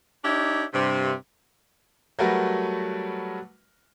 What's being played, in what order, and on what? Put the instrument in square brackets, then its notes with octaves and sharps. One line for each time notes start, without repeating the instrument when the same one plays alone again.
[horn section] D4 D#4 G4 C#5 E5
G2 C3
[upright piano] F#3 G3 A3 F#4 A#4 B4